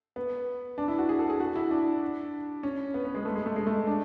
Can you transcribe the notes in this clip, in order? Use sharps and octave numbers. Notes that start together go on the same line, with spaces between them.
B3
D4
E4
F#4
G#4
A4
G#4
F#4
E4
D4
C#4
B3
B3
G#3
A3
G#3
A3
G#3
A3
D4